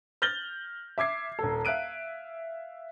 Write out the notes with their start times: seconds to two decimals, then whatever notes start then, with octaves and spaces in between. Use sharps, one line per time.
0.22 F6 G6 A6 A#6 F#7 G7
0.98 E5 D6 G#6 C7
1.39 D#1 A4
1.65 E5 F5 F#6 D7 D#7